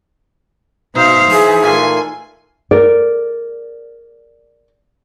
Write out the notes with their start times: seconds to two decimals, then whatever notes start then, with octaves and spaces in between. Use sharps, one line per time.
0.95 B2 D#4 C5 E5 F5
1.31 E3 G#4
1.63 A#2 A3 G#5 C6
2.71 A#4 D5